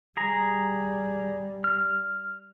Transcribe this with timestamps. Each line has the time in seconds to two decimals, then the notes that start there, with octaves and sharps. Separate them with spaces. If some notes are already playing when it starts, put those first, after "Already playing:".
0.17 G3 G#4 A#5
1.64 F6